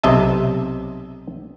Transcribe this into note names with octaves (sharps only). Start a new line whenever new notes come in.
B1 C3 D#5 E5 A5